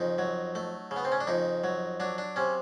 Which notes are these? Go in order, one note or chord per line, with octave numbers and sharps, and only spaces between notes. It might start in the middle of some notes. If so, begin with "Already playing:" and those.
Already playing: F2 C#3 D#4
F#3
A3
C#3
B3
C4
C#4
D4
F2 D#4
F#3
F#3 D4
D4
C3 C#4